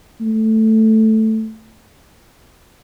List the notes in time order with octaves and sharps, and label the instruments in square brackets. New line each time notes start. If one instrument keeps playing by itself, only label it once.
[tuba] A3